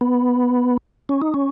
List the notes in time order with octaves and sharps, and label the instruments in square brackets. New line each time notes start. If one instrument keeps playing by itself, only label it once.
[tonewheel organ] B3
C#4
D#4
C#4